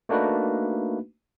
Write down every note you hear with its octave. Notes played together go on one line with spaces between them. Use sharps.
A3 A#3 D4 D#4 F#4 B4